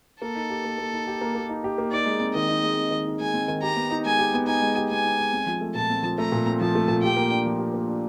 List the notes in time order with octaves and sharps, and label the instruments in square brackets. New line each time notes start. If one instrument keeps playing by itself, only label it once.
[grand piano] A#3 [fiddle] A4
[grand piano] D#4
G4
A#3
A#3
D#4
G4
A#3
A#3
D#4
G4
A#3
[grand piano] D#4 [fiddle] D5
[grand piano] G#3
C4
[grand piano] D#3 [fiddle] D#5
[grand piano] D#4
G#3
C4
D#3
D#4
[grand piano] G#3 [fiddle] G#5
[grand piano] C4
D#3
[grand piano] G4 [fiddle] A#5
[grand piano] B3
D#4
[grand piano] G#3 [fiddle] G#5
[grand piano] G4
B3
[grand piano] D#4 [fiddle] G#5
[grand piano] G#3
G4
[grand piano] B3 [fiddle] G#5
[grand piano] D#4
G#3
C4
F3
A3
[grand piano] A#2 [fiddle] A5
[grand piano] C4
F3
[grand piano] A3 [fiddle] A#5
[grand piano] A#2
C4
[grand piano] F3 [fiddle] A5
[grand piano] A3
A#2
[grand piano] G4 [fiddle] G5
[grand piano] A#3
D4
F3
G4
A#3
D4